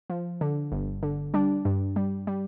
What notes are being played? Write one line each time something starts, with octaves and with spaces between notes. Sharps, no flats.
F3
D3
G1
D3
G3 D4
G2
G3
G3